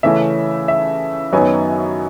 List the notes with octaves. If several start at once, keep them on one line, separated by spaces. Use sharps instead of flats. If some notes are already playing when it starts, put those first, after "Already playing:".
C#3 E3 A3 C#4 E5
E5
F#2 D#3 F#3 B3 D#4 G#5